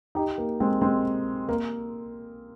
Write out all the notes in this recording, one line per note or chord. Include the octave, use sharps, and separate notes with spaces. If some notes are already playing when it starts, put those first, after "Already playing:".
D#4 G4
A#3
G#3 C4
G#3 C4
A#3